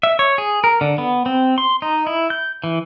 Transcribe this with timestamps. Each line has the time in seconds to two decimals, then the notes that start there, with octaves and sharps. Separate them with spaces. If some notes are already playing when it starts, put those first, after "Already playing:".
0.03 E5
0.19 C#5
0.38 G#4
0.64 A#4
0.81 D3
0.98 B3
1.26 C4
1.58 C6
1.82 D#4
2.07 E4
2.30 G6
2.64 E3